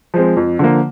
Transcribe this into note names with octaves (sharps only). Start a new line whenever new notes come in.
F3 G#3 C4
F2
D3 F3 A#3